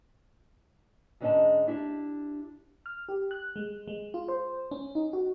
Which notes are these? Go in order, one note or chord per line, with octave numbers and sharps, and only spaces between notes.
G#2 D3 G#3 C#4 D#5 A5
D4 E4 G4
F6
G4
F#6
G#3
G#3
F4
C5
C#4
D#4
F#4